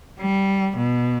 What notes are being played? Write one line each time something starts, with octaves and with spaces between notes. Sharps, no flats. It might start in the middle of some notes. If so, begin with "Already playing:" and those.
G3
B2